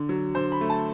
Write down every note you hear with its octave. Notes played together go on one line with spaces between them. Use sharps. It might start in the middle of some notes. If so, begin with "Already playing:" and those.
Already playing: D3
F#3
D3 C5
B5
A3
A5